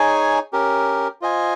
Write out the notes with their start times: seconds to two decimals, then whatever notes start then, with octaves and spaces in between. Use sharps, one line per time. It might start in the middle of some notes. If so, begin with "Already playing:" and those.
Already playing: D#4 G#4 C#5 G#5
0.53 C#4 G4 A#4
1.21 F4 C5 D#5 G#5